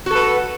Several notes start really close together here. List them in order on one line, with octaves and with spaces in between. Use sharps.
F#4 A4 B4